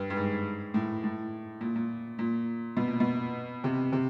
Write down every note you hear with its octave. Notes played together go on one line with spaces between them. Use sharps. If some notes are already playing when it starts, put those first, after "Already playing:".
Already playing: G2
G2
G#2
A2
A2
A#2
A#2
A#2
B2
A#2
B2
C3
C3